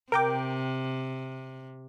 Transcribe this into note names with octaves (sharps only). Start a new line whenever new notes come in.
C3 A#4 G5 D6